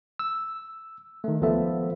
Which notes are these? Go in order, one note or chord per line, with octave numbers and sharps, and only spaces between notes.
E6
D#3 A3
C#2 F3 B3 A4 E5